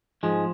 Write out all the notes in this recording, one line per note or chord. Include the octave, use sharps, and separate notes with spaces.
G#2 F3 G#3